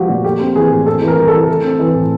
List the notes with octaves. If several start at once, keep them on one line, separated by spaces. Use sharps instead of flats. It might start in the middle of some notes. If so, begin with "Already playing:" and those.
Already playing: F3 G#3 B3 F#4 G4
A#2
A3 G4
C4
E3 G#4
A2
C4 A4
E3
A#4
G3
E3 A4
A3
C4
E3
A2